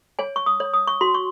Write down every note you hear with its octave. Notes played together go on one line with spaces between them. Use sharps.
C#5 G#5
C#6
D#6
C#5
D#6
C#6
F#4 C6
C#6